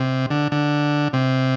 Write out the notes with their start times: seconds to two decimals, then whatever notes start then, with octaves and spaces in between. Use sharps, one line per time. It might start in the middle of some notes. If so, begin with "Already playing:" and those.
Already playing: C3
0.31 D3
0.52 D3
1.13 C3